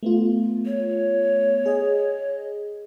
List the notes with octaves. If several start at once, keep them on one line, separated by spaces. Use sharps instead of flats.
A3 B3 F4
C#5
G#4 D#5